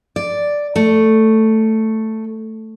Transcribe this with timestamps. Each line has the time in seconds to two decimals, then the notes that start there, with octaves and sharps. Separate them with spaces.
0.16 D5
0.76 A3